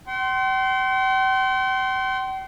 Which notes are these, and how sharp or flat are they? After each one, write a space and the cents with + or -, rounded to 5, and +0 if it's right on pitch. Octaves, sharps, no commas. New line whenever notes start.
G5 -45 C6 +0